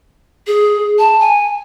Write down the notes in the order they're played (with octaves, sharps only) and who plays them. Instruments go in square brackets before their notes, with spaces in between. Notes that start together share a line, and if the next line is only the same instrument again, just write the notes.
[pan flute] G#4
A5
G#5